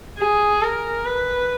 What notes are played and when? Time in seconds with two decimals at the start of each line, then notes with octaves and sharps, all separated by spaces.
0.19 G#4
0.62 A#4
1.06 B4